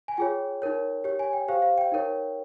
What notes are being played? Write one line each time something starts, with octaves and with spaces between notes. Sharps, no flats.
G#5
F4 G#4 C#5 G5
D#4 A#4 C#5
G4 C#5
G#5
G5
G4 C5 F5
F5
G5
D#4 A#4 C#5